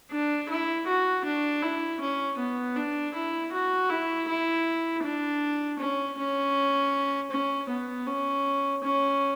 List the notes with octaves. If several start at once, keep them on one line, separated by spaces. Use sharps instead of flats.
D4
E4
F#4
D4
E4
C#4
B3
D4
E4
F#4
E4
E4
D4
C#4
C#4
C#4
B3
C#4
C#4